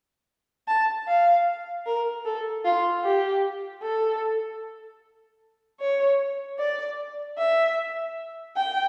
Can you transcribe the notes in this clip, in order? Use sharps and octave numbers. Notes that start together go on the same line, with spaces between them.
A5
F5
A#4
A4
F4
G4
A4
C#5
D5
E5
G5